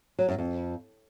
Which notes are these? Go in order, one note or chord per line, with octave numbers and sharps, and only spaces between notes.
F#3
F#2
F2